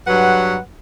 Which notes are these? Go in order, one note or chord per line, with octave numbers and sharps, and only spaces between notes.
G2 F#3 B4 F#5